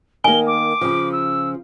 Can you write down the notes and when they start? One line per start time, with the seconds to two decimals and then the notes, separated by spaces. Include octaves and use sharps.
0.24 D#3 A#3 G#5 G7
0.47 D6
0.81 C#3 F3
1.12 E6